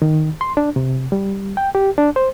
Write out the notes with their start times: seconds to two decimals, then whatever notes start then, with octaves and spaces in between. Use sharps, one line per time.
0.02 D#3
0.41 C6
0.57 D4
0.76 C3
1.12 G3
1.57 G5
1.75 G4
1.98 D4
2.16 C5